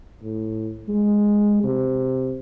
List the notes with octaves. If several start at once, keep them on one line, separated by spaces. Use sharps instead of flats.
A2
G#3
C3